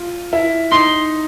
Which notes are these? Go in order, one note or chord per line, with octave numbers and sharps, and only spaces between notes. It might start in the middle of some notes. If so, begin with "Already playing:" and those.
Already playing: F4
E4
D#4 C6